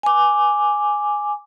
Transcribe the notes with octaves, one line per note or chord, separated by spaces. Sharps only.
G#5 D6